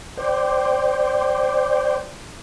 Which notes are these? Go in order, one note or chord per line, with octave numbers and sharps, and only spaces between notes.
C5 D5 G5